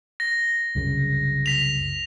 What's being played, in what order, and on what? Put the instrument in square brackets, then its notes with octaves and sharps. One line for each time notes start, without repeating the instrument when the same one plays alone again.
[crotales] A#6
[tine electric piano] C2 F#2 C#3
[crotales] B6 F7